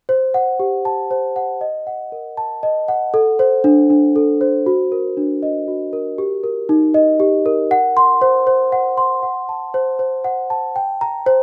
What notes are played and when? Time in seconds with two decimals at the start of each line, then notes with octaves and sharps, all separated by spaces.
0.09 C5
0.34 F#5
0.59 G4
0.85 A5
1.11 C5
1.36 F#5
1.61 D#5
1.87 F#5
2.12 A#4
2.37 A5
2.63 D#5
2.88 F#5
3.14 A4
3.39 C5
3.64 D4
3.90 D4
4.16 A4
4.41 C5
4.66 F#4
4.92 A#4
5.17 D4
5.43 D#5
5.68 F#4
5.93 A#4
6.18 G4
6.44 A#4
6.69 D#4
6.94 D#5
7.20 G4
7.46 A#4
7.71 F#5
7.97 C6
8.22 C5
8.47 C5
8.72 F#5
8.97 C6
9.23 F#5
9.49 A5
9.74 C5
9.99 C5
10.24 F#5
10.50 A5
10.76 G5
11.01 A#5
11.26 C5